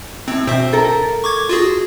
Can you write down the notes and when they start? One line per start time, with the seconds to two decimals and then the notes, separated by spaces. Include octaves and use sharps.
0.28 A2 C4
0.47 B2 C4 E5
0.73 A4 A#4
1.24 C#6 D6 G#6
1.49 F4 F#4 G#4